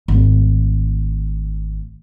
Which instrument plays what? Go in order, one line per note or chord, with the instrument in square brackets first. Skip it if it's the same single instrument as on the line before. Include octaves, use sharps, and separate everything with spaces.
[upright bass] G#1 A3